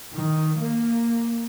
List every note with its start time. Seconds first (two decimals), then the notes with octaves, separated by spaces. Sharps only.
0.14 D#3
0.59 A#3